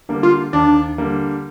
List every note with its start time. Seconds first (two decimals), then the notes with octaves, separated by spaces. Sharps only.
0.09 D3 G3 A#3
0.23 F4
0.53 D#2 D4
0.98 D3 G3 A#3